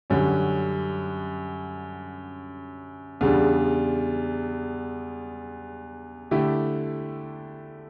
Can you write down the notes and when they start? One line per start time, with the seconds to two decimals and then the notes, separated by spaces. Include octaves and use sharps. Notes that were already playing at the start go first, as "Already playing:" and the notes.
0.10 F#2 D3 G3 C#4
3.21 E2 C#3 G3 D4
6.31 D3 A3 E4 G4